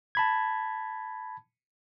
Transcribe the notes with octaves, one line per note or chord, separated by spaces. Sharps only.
A5 B5 G#6